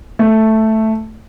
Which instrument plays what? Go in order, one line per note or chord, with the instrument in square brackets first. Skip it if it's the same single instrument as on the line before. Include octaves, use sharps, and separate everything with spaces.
[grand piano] A3